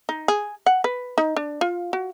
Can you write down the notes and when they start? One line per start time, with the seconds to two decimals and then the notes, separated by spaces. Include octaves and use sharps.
0.09 D#4
0.28 G#4
0.66 F#5
0.84 B4
1.18 D#4
1.36 D4
1.61 F4
1.93 F#4